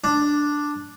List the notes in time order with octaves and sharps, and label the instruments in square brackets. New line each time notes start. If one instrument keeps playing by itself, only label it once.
[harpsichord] D4